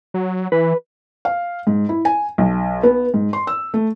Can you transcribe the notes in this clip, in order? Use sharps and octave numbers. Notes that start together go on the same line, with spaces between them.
F#3
E3 B4
F5
G#2
E4
G#5
B1
B3
G#2
C6
E6
A3